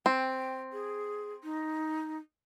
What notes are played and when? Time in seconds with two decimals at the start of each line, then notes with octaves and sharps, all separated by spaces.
0.06 C4 G5
0.73 G#4
1.44 D#4